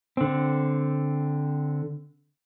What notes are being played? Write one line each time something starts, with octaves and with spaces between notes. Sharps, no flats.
D3 C4